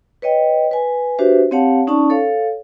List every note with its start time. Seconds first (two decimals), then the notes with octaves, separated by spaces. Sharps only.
0.22 B4 C#5 D#5 G5
0.71 B4 G#5
1.19 D4 F#4 G4 B4 C5 E5
1.51 C4 G4 C#5 F5 F#5 A5
1.87 C#4 D#4 D5 A5 C#6
2.10 A4 C#5 F5